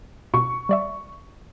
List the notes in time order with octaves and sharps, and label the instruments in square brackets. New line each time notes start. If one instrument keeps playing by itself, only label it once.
[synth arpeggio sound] B2 [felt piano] C#6
[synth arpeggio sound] G3 D5 E5